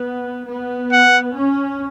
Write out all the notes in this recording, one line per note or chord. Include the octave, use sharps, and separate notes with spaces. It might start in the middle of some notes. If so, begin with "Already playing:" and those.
Already playing: B3
B3
F#5
C#4